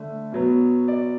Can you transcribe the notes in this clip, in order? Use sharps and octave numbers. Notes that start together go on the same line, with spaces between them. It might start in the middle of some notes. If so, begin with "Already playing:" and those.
Already playing: D3 A3
B2 F#3 B3
D5